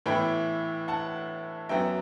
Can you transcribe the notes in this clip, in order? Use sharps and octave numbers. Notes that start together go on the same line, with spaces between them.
A2 E3 B3 E4 G5 B5
F#5 A5
F#2 F#3 B3 E5 G5